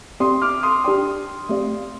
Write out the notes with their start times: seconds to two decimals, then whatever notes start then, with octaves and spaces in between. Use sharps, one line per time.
0.20 C4 G4 D5 C6 D#6
0.42 D6 F6
0.63 C6 D#6
0.84 D4 G4 D5 G5 C6 D#6
1.49 A3 C4 G4 D5 F5